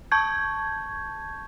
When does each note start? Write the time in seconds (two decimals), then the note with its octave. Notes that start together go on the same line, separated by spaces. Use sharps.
0.12 A5 C#6 G6 G#6